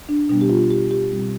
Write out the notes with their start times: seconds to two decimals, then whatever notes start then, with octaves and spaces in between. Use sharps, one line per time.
0.09 D4
0.29 B2 G3 B3 D4
0.41 G4
0.50 F4
0.71 G4
0.91 G4
1.12 B2 G3 C4